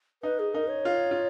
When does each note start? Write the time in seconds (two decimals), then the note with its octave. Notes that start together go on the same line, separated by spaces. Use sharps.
0.23 D#4 B4
0.39 G#4
0.54 D#4 A#4
0.69 C#5
0.85 F4
1.11 F4